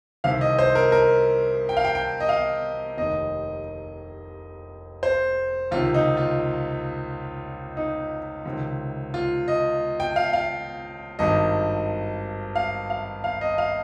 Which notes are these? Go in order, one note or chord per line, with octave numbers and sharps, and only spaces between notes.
C2 C3 D#3 F5
D#5
C5
A#4
A#4
G5
F5
G5
G5
D#5
F5
F1 D#2 D#3 D#5
C5
C#2 C3 D#3 F4
D#4
F4
D#4
C#2 C3 D#3
F4
D#5
G5
F5
F5
G#1 G2 D#3 D#5
F5
F5
F5
D#5
F5